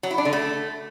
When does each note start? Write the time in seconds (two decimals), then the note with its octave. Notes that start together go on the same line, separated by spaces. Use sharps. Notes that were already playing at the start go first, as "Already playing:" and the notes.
0.03 F#3
0.11 E4
0.18 D4
0.25 D3
0.33 A3